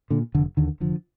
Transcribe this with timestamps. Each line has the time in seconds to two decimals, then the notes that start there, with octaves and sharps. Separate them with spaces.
0.10 A#2 D3
0.35 F1 D3
0.57 D#2 D3 D#3
0.80 F1 D3 F3